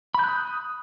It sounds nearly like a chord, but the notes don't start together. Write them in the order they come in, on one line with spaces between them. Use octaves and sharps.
B5 G6 F#6 D#6